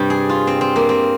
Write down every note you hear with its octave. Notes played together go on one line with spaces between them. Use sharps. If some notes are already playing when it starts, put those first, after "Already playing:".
Already playing: G2 C3 G3
G#4
F4
C4
C4
A#3
C4